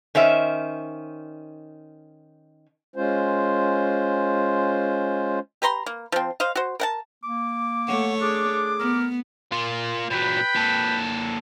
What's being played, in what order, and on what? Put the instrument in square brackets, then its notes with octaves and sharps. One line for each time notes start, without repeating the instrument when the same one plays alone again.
[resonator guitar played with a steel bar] D#3 C#4 C5 E5
[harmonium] G#3 C#4 F4 C5
[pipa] G4 B4 A#5 C6
A#3
F3 C4
C5 D#5 F5
F#4 C5
A#4 F#5 A5
[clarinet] A#3 [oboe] D6
[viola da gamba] A3 C#5 [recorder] F#5
[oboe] D4 [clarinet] G#4 [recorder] D6
[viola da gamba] B3 [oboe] A#4
[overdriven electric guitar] A#3 F4
[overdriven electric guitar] A#2 F#3 [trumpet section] B4 G5 B5
[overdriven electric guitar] A#2 A4